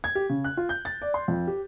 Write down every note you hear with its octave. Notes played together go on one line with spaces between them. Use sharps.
G#6
G4
C#3
F#6
F4
G6
A6
D5
C6
F2
G4